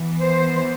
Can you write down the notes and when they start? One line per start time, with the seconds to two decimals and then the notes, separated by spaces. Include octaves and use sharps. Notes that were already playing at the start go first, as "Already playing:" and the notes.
Already playing: E3 B3
0.19 C5